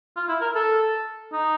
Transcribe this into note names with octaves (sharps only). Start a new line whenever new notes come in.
F4
E4
A#4
A4
D#4